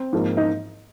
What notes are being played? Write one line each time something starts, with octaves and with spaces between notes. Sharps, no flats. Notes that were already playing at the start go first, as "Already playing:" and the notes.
Already playing: C4
G#2 F3 A#3
D#4